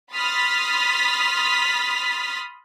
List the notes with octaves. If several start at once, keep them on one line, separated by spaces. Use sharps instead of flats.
B5 C6 D#6 F6 A6 B6